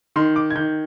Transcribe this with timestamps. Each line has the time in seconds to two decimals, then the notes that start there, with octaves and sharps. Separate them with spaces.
0.16 D#3 C6
0.36 D6
0.50 G#6
0.55 D#3 G6